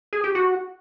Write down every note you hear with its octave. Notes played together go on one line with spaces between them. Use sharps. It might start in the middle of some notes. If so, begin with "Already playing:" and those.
G#4
G4
F#4